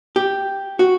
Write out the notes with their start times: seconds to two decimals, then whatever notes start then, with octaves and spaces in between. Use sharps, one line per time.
0.16 G4
0.79 F#4